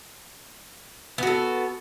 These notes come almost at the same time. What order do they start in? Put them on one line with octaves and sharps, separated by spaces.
B3 F#4 A4